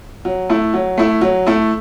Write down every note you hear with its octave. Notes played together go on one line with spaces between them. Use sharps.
F#3
A3 E4
F#3
A3 E4
F#3
A3 E4